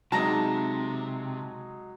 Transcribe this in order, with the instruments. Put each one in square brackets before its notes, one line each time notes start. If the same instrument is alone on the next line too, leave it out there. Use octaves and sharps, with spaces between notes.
[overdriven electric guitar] C3 [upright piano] F#3 G#3 D#4 [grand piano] A5 A#5 A#6